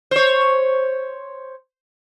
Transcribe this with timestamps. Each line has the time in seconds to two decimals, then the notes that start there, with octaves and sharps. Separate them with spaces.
0.11 C5 C#5